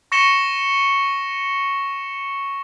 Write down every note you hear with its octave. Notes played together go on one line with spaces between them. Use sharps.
C#6 A#6 C#7 E7 G7